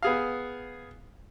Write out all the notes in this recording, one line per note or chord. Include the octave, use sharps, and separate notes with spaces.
B3 G#4 F5